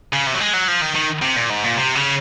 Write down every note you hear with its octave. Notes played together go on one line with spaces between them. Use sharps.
C#3
C3
F#3
G#3
F#3
F3
D#3
D#3
C3
A#2
G#2
A#2
C3
C#3